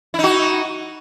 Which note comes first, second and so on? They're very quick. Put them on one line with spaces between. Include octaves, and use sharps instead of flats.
E4 D#4 F#4